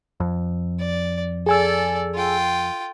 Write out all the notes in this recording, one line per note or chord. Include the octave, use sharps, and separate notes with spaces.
F2
D5
G#4 A4 D5 G#5 E6
F4 G5